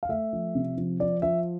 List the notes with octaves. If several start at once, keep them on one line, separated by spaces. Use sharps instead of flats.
F5
A3 E5
F3
C3
F3
F3 D5
F3 E5